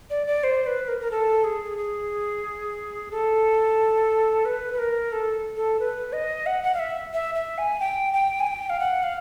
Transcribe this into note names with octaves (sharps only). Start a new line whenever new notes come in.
D5
D5
C5
B4
A#4
A#4
A4
G#4
G#4
A4
B4
B4
A#4
A4
A4
B4
D#5
F#5
F#5
F5
E5
E5
E5
G#5
G5
G5
G#5
G5
F5
F#5
F5